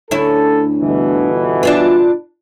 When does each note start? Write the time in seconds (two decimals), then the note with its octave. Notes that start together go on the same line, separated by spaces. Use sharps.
0.11 D2 C#4 E4 A4
0.81 G1 B2 E3
1.63 D4 F4 B4